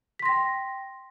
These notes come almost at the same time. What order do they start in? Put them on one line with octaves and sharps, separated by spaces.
B6 C6 A#6 G5